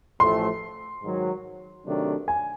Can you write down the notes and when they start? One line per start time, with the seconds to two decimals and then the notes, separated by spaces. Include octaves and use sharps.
0.20 A1 A2 F3 A3 C6
1.03 G#2 D#3 F#3
1.86 C3 D#3 F#3 A3 D4
2.28 G#5